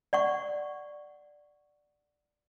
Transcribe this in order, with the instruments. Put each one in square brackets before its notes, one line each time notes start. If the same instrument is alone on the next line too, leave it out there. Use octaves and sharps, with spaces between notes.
[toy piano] D5 F#5 C#6